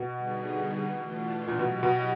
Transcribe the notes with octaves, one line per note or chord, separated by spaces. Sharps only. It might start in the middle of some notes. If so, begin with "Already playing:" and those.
Already playing: B2
D3 G3 B3 D#4 G#4
E3 A3 D4 F4
A#2
B2 F#3 B3 E4 G4
B2